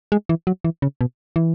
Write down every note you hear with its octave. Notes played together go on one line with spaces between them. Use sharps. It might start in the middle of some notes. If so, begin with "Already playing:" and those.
G#3
E3
F#3
E3
C#3
B2
E3